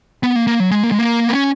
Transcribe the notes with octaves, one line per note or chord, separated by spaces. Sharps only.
B3
A#3
A#3
F#3
G#3
A#3
G#3
A#3
B3
C#4